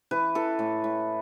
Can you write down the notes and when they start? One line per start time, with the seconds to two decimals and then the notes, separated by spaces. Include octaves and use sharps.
0.11 E3 B4
0.35 E3 A4
0.59 A2
0.84 A2